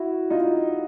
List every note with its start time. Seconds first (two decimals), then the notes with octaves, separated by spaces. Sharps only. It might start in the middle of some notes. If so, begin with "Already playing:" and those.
Already playing: E4 F#4
0.30 D#4 F4